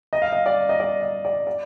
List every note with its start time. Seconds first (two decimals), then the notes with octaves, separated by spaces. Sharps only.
0.13 D#5
0.22 F5
0.32 D#5
0.46 D5
0.69 D#5
0.80 D5
1.02 D#5
1.25 D5
1.47 D5